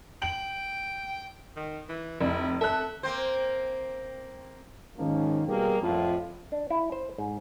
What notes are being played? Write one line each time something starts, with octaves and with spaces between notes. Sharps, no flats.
G5 F#7
D#3
E3
F1 E4
A4 E5 F#6
A#3 C4 C5
G#2 D#3 F3 A#3 C#4
B2 G3 A#3 G4 G#4 A#4
F2 A2 F4
D4
E4
C5
G#2